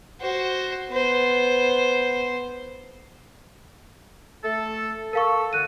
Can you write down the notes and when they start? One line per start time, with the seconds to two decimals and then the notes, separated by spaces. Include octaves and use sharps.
0.20 F#4 C5
0.90 B3 C5
4.44 A3 A4
5.13 A4 A#4 F5 C#6
5.53 A2 D3 F#4 F#6 D#7